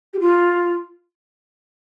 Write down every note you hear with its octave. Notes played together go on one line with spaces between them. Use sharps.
G4
F4